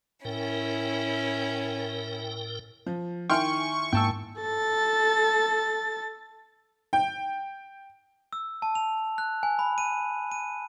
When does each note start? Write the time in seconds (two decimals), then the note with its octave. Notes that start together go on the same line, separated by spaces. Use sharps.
0.25 A2 C#4 E4 A#4 G5
2.86 F3
3.30 D#3 E4 G5 G#5 C6 C#6 F6
3.93 G#2 A#3 G5 A5 E6
4.41 A4 A6
6.93 G5
8.33 E6
8.62 A5
8.75 F7
9.18 F#6
9.43 G#5
9.59 B5
9.78 D#7
10.31 D#7